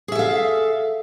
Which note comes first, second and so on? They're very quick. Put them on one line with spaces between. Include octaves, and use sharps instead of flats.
G#4 E5 A4 F5